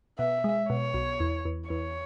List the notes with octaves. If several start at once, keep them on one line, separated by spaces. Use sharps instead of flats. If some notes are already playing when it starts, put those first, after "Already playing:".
B2 E5
G#3
B2 C#5
B1
E2
E2
E2 C#5